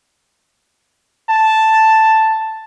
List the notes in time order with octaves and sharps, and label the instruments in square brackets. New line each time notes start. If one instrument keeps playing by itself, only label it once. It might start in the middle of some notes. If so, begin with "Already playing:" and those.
[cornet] A5